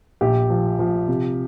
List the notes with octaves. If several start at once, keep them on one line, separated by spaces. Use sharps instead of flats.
A#1 G4
F3
F3
C3